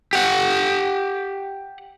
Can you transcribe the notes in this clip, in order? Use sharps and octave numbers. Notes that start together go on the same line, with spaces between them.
G4 F#5